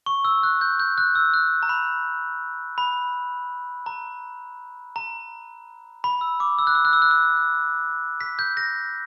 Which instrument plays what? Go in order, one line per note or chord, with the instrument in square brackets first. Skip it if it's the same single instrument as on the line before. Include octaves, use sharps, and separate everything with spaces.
[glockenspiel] C#6
E6
F#6
G6
G6
F#6
E6
F#6
A#5
B5
B5
A#5
A#5
B5
E6
D6
E6
F#6
E6
F#6
E6
F#6
E6
B6
G6
A#6